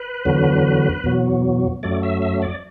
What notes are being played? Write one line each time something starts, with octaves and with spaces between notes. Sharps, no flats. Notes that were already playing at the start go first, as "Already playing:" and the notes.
Already playing: B4
E2 D3 F#3
E2 B2 F#3
F#2 F#3 A3 D5
E5
E5
D5